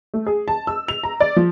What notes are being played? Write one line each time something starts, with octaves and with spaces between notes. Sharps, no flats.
A3
G#4
A5
E6
F7
A#5
D5
F3